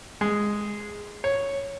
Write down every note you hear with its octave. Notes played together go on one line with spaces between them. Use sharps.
G#3
C#5